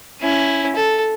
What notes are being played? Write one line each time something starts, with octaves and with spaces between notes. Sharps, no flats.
C#4 E4
A4